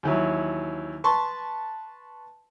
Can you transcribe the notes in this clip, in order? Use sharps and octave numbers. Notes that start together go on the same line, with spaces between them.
D#2 E3 F#3
B4 A5 C6 C#6